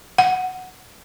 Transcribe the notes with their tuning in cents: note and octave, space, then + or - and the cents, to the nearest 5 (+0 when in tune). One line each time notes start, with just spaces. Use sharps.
F#5 +0